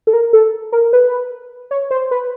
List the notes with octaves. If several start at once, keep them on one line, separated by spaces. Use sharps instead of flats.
A4
A#4
A4
A#4
B4
C#5
C5
B4